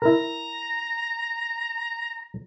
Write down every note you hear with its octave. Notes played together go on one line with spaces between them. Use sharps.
E4 A#4 A#5